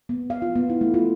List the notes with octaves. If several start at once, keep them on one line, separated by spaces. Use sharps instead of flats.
B3
F5
F4
B3
E4
A3
F4